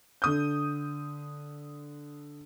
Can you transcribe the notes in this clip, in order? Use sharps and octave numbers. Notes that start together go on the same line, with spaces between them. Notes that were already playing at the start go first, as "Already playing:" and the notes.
D3 D#6 G6